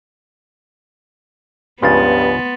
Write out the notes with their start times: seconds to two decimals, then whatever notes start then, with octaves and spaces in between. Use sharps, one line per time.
1.83 C#2 G2 C#3 F3 B3 C6 A6